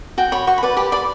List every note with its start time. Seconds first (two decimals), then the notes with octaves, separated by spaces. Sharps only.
0.18 F#4 G5
0.32 C#5 B5
0.47 F#4 C#6
0.58 B5
0.63 B4 D5
0.77 G4 B5
0.92 D5 B5